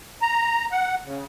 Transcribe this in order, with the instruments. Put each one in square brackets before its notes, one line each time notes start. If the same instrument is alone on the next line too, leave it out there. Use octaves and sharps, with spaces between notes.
[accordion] A#5
F#5
C#3